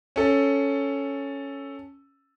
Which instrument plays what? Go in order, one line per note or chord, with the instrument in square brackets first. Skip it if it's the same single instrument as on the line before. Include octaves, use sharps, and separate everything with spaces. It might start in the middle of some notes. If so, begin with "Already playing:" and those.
[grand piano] C#4 A4